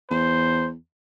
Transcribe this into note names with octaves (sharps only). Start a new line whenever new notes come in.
E2 C5